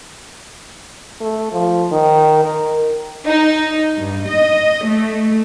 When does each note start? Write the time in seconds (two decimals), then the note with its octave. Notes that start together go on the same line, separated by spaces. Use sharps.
1.21 A3
1.52 F3
1.91 D#3
2.44 A#4
3.27 D#4
3.97 G2
4.27 D#5
4.85 A3